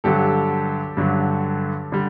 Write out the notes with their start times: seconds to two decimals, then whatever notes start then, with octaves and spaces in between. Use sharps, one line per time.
0.04 G2 D3 F#3 G4 A4
0.97 G2 D3 F#3
1.92 D3 G3